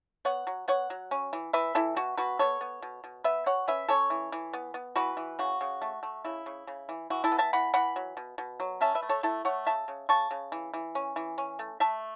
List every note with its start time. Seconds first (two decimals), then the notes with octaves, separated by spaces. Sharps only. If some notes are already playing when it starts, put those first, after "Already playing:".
0.25 B3 C#5 F#5
0.47 F#3
0.68 B3 C#5 F#5
0.90 F#3
1.11 C#4
1.33 E3
1.53 E3 B4 E5
1.75 E3 E4 A4
1.96 B2 F#4
2.17 B2 F#4 B4
2.39 B3 A4 C#5
2.61 B3
2.82 B2
3.04 B2
3.24 B3 B4 E5
3.46 B2 C#5 F#5
3.68 C#4 B4 E5
3.88 C#4 A4 C#5
4.10 E3
4.32 E3
4.53 B3
4.74 B3
4.96 E3 F#4 B4
5.17 E3
5.39 C#3 F#4
5.61 C#3
5.82 A3
6.03 A3
6.25 C#3 E4
6.46 C#3
6.67 C#3
6.89 E3
7.10 E3 F#4
7.24 E4 A4
7.32 B3
7.38 E5 A5
7.53 E3 F#5 B5
7.74 E3 F#5 B5
7.96 F#3
8.17 B2
8.38 B2
8.60 F#3
8.81 C#4 E5 A5
8.95 B4 E5
9.02 A3
9.09 A4 C#5
9.23 A3 E4 A4
9.45 A3 C#5 F#5
9.67 C#3 E5 A5
9.88 C#3
10.09 C#3 A5 C#6
10.31 C#3
10.52 E3
10.74 E3
10.95 C#4
11.16 E3
11.38 C#4
11.59 A3
11.80 A3 E5 A5